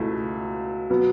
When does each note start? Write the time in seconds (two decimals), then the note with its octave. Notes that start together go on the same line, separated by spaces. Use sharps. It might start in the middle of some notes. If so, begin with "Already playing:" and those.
Already playing: C#2 B2 A3 E4
0.90 B2 F#3 B3